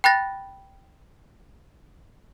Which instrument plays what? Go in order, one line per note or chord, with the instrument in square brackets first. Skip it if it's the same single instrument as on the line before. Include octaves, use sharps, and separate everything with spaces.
[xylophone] G5 B5 F#6 A6 A#6